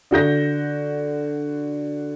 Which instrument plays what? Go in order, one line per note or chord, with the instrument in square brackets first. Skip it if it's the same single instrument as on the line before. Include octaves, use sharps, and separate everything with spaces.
[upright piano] D3 F#4 G6 A#6